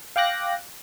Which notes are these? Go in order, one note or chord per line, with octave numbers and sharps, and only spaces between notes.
F5 G5 D6 F#6 A#6